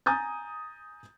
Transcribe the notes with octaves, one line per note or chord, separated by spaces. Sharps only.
G#5 A#5 D#6 G6 A6